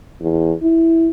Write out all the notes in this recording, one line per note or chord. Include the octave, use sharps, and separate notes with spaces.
E2
E4